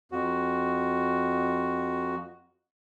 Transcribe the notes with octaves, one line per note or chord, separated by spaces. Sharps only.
F2 F#4